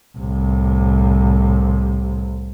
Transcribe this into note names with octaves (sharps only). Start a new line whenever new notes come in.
C2 A2